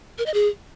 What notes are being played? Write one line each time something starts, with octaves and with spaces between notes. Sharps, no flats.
A#4
D#5
G#4